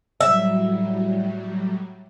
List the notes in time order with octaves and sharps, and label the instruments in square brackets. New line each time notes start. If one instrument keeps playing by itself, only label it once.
[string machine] A2 F#3 G3 [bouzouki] E5